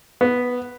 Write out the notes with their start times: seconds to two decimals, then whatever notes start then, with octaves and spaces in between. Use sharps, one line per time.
0.21 B3